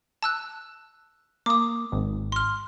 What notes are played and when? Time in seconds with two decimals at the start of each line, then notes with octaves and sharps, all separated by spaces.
0.22 A5 E6 F#6
1.46 A#3 D6 D#6
1.92 G#1
2.32 C6 F6